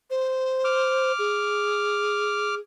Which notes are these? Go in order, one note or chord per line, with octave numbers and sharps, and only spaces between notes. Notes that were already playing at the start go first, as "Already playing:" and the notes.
C5
D6 F6
G#4